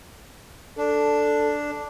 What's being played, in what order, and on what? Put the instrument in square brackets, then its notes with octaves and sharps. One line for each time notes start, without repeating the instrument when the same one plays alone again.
[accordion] D4 [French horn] A4